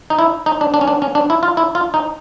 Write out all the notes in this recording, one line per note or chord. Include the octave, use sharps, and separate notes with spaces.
D#4
E4
D#4
D4
D4
C#4
D4
C#4
D4
E4
F4
E4
F4
D#4